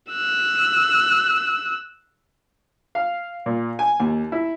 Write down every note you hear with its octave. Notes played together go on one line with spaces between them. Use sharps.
E6 F#6
F5
A#2
G#5
D#2
E4